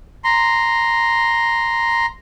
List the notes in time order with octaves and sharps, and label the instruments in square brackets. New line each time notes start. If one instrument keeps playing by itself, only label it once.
[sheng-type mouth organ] A#5 C6